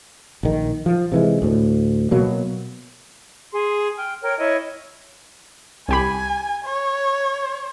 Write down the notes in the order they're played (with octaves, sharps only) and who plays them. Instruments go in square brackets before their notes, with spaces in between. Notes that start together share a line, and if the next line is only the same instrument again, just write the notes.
[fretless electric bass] A#1 D#3
F3
C3 E3 G#3
D2 A2
B2 F#3 A#3
[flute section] G#4 C6
G5 F6
A#4 C#5 G5 F6
E4 C#5 D#5
[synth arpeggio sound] C2 G4 B5 [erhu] G#5
[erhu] C#5